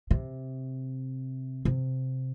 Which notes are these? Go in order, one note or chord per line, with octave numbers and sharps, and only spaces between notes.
C3
C3